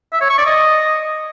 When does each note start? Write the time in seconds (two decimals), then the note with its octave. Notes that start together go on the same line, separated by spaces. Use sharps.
0.13 E5
0.21 C#5
0.30 C#6
0.38 D5
0.46 D#5